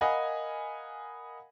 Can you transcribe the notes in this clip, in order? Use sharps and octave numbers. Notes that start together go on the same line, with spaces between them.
A#4 D#5 F5 F#5 G#5 B5